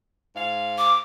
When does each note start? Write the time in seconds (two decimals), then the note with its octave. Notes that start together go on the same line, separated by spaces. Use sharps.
0.35 G#2 F5
0.78 D6